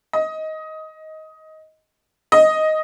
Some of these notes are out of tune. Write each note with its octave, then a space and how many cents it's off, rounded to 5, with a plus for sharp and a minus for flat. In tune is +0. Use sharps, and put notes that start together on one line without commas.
D#5 +15
D#5 +5